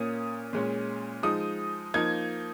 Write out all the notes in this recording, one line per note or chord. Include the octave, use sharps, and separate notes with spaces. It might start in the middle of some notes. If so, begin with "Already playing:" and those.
Already playing: A#2 A#3 C#4 D#6
A#2 G#3 C#4
F3 G#3 D#4 D#6
F3 A#3 D#4 G#6